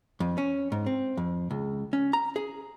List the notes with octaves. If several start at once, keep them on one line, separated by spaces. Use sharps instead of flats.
F2
C#4
G#2
C4
F2
C#2
C#4
A#5
G#4